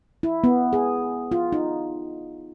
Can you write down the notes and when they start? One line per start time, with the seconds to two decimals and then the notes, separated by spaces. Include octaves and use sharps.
0.23 E4
0.44 B3
0.73 G#4
1.32 F4
1.52 D#4